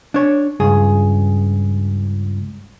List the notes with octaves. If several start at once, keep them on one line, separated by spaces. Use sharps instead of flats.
D4 C#5
C#2 G2 G#4